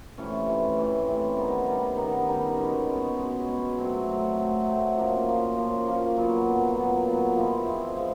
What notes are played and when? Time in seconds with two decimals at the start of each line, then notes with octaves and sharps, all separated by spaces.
0.18 C3 E3 A3 C#4
0.47 C3 E3 A3 C#4
0.77 C3 E3 A3 C#4
1.07 C3 E3 A3 C#4
1.37 D#3 G3 B3 D#4
1.66 D#3 G3 B3 D#4
1.97 D#3 G3 B3 D#4
2.27 D#3 G3 B3 D#4
2.56 B2 G#3 C#4
2.87 B2 G#3 C#4
3.17 B2 G#3 C#4
3.46 B2 G#3 C#4
3.77 F#3 A3 C4
4.06 F#3 A3 C4
4.37 F#3 A3 C4
4.66 F#3 A3 C4
4.96 F3 A#3 C#4
5.26 F3 A#3 C#4
5.57 F3 A#3 C#4
5.87 F3 A#3 C#4
6.17 A#2 F#3 B3
6.47 A#2 F#3 B3
6.77 A#2 F#3 B3
7.06 A#2 F#3 B3
7.36 F3 G#3 C4 E4
7.66 F3 G#3 C4 E4
7.97 F3 G#3 C4